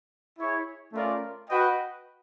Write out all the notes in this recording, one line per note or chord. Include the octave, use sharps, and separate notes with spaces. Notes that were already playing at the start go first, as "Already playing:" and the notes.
E4 G#4 C#5
A3 C#4 F4 A#4 D5
F#4 B4 D#5 G5